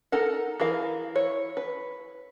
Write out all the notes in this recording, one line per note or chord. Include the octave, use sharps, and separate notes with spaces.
D#4 A4 A#4 F#5
E3 G#4 A#4 F5
E4 C#5
B4